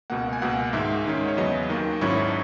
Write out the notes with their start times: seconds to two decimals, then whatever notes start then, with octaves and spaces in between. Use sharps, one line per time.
0.10 C#2 B2 A#3 F#5
0.33 G#5
0.42 C#2 B2 A#3 F#5
0.73 G#2 D#3 G#3 E5
1.05 G#2 D#3 G#3 C#4
1.28 C#5
1.37 E2 C#3 F#3 B3 D#5
1.69 D#2 D#3 A#3
2.01 G#1 G#2 F#3 C#4 E4 C#6